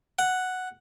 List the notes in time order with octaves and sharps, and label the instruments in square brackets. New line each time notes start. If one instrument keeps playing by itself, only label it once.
[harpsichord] F#5